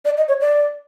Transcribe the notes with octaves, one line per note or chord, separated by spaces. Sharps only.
D5
D#5
C#5
D5